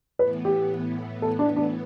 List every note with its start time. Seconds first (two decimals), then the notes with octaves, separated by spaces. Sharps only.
0.18 A2 E3 B3 B4
0.45 G4
1.22 A4
1.39 D4
1.56 D4